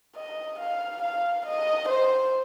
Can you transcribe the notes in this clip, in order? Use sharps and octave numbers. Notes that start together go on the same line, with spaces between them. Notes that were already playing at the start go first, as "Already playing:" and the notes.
D#5
F5
F5
D#5
C5